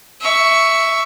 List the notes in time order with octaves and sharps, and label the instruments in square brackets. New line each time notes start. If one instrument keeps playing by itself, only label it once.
[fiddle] E5 C#6